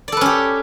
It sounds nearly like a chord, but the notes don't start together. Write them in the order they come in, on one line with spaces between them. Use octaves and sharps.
D5 A4 B4 C#4 G4